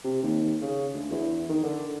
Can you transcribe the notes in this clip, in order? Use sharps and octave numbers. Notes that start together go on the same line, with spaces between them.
C3
D#2
C#3
D2
E2
D#3
D3